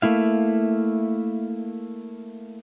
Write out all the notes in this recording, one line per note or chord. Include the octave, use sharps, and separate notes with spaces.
A3 A#3 E4 F5